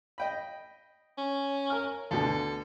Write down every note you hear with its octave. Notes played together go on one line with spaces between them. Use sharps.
D#5 G5 B5
C#4
A#4 F6
D2 B2 D3 A4